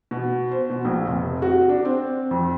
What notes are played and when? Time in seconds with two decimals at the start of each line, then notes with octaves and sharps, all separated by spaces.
0.11 B2
0.51 C5
0.70 B2
0.85 A#1
1.07 F1
1.42 F#4
1.69 D4
1.85 C4
2.31 F2